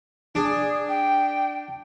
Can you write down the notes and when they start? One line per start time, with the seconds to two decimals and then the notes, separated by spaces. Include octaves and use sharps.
0.35 D4 G#4
0.89 G5